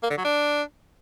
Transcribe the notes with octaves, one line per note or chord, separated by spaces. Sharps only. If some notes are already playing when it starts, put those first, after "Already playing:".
A#3
D3
F#3
D4